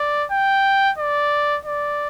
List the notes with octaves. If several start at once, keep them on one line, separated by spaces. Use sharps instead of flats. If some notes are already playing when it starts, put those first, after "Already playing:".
Already playing: D5
G5
D5
D5